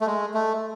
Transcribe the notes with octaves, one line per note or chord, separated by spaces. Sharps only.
A3
G#3
A3